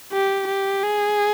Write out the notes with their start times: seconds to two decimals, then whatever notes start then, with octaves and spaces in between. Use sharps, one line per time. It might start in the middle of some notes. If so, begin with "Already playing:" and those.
0.13 G4
0.48 G4
0.84 G#4